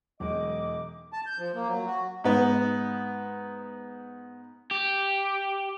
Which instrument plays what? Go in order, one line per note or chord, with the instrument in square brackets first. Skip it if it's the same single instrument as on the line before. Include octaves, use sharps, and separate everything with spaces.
[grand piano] E1 G#3 D#4 [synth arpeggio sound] E2 F#3 [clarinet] D#5 [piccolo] D6
[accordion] A5
G6
F3
A#3
F#3
F#4
[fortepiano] G#2 B3
[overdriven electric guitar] G4